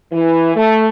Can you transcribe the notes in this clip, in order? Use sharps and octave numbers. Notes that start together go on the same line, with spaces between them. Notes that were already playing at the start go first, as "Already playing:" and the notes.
E3
A3